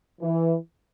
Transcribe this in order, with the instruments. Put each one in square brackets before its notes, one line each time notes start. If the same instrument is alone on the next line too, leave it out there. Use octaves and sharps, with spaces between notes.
[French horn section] E3